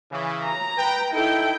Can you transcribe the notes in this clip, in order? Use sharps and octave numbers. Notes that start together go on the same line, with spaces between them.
C#3 E3
A#5
B4 G5
D#4 E4 A4 G5